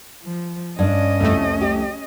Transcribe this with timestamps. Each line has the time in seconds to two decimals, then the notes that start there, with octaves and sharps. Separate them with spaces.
0.23 F3
0.79 G2 C#4 D4 D#5
1.20 C2 F2 A3
1.61 G4